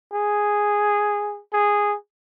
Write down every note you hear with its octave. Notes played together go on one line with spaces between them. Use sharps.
G#4
G#4